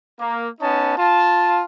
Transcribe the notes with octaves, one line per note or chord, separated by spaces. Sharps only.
A#3
B3 C#4 D#4 A5
F4 A5